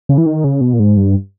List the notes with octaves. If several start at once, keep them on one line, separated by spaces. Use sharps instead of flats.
C#3
E3
D#3
C#3
B2
A#2
G#2
G2